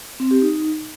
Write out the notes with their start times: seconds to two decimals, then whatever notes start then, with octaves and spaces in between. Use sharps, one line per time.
0.20 C4
0.31 G4
0.42 D#4